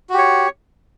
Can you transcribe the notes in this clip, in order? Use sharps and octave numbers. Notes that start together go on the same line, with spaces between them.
F#4 G4 C#5